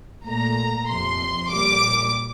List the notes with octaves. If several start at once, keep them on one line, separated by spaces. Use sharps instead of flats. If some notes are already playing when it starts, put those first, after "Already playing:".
A#2 A3 A#5
F2 C3 F3 C6
A#2 G3 D6